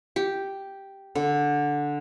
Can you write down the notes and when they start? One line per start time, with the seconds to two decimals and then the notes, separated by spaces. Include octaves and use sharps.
0.16 G4
1.15 D3